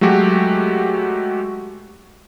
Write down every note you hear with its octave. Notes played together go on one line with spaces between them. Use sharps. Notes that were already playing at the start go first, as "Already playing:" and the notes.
F#3 G#3 A3 F#4 G4